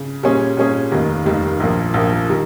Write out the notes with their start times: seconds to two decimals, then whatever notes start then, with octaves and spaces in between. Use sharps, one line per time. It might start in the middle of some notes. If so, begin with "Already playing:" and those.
Already playing: C#3
0.23 A#2 G3 C#4 G#4
0.57 A#2 G3 C#4 G#4
0.92 F1 D#2 D#3 G3 A#3
1.26 F1 D#2 D#3 G3 A#3
1.60 A#1 A#2 F3 A#3
1.94 A#1 A#2 F3 A#3
2.29 D#3 G3